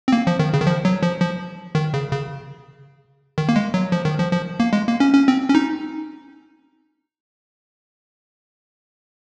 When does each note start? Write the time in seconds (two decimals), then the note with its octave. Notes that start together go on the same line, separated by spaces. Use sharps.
0.08 C4
0.13 A#3
0.27 F3
0.39 D#3
0.54 C#3
0.61 D#3
0.67 F3
0.85 F#3
1.03 F3
1.21 F3
1.75 D#3
1.94 C#3
2.11 C#3
3.38 D#3
3.49 A#3
3.56 G#3
3.74 F#3
3.92 F3
4.05 D#3
4.19 F3
4.32 F3
4.60 A#3
4.73 G#3
4.87 A#3
5.00 C#4
5.13 C#4
5.28 C4
5.49 C#4
5.55 D#4